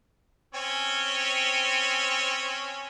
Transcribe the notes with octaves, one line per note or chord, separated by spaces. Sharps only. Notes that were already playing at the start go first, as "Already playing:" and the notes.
C4 C#4 C#5